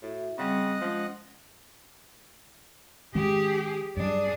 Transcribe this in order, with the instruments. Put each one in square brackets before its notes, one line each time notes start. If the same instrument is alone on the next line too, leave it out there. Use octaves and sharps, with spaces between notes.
[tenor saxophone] A2 [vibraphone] F#4 E5
[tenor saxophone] C#3 [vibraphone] G3 C4 [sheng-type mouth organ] D#5 F#5
[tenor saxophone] F3 [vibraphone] G#3 C#4
[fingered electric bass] D#3 G#3 C#4 [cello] G4 G#4
[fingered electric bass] G2 F#3 [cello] D4 G#4